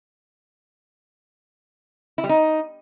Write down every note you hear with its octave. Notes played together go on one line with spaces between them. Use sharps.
E4
G3
D#4